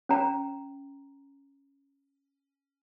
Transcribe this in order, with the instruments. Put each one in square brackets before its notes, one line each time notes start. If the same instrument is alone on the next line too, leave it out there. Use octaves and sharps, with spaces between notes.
[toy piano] C#4 A#5